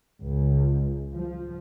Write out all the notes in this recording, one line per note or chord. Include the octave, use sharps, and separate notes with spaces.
C#2
F3